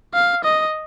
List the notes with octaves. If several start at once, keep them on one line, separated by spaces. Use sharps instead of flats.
F5
D#5